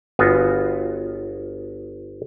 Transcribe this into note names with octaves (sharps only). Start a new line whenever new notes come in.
G1 B3 F4 F#4 G#5